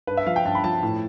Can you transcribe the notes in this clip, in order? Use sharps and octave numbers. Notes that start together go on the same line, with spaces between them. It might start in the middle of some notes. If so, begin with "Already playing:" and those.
G2 B4
E5
F3 F5
G5
G2 A5
B5
F3 A5
A2